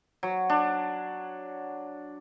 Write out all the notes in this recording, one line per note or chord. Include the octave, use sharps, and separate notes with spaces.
F#3
D4